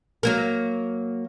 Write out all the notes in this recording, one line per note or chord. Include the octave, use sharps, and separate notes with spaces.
F#3 A#3 A#4